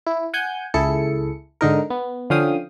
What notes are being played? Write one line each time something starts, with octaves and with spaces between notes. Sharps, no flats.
E4
F#5 G#5 G6
C#2 E4 G#4 A4 C#7
G#2 D3 D#4 A#4
B3
D3 F3 C#4 F5 G5 D#6